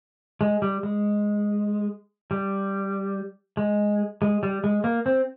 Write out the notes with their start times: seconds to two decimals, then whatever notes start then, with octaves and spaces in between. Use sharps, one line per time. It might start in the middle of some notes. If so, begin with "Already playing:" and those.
0.41 G#3
0.62 G3
0.83 G#3
2.31 G3
3.57 G#3
4.22 G#3
4.43 G3
4.64 G#3
4.84 A#3
5.06 C4